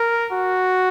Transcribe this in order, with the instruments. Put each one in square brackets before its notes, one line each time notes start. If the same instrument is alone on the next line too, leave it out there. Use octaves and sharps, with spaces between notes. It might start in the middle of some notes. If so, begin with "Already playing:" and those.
Already playing: [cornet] A#4
F#4